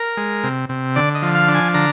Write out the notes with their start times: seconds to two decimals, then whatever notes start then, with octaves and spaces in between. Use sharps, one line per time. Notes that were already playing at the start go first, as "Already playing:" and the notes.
Already playing: A#4
0.17 G#3
0.43 C3
0.69 C3
0.95 D3 D5
1.15 D#5
1.22 F3
1.35 F5
1.48 D4
1.54 G#5
1.74 D3 A#5